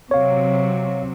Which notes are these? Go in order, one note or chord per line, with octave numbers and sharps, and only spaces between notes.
C3 F#3 C#5 F5